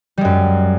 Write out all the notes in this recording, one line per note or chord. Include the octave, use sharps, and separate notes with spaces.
F#2 G3 G#3